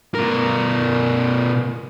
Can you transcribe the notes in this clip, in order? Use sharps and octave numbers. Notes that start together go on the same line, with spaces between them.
B2 A#4